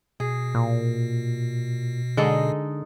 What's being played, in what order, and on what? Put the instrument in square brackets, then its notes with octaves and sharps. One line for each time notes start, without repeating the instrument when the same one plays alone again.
[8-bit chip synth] B2 [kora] G#4
[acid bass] A#2
[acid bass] D3 [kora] G#3 D#4 A4